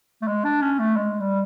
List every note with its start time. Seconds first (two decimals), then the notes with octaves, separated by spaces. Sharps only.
0.22 A3
0.27 G#3
0.45 D4
0.62 C#4
0.79 A3
0.96 G#3
1.20 G3